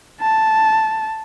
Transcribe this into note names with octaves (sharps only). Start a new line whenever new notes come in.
A5